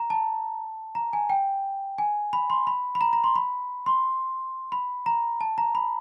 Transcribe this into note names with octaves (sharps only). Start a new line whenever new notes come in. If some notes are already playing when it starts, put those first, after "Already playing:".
Already playing: A#5
A5
A#5
G#5
G5
G#5
B5
C6
B5
B5
A#5
A#5
C6
B5
C6
B5
A#5
A5
A#5
B5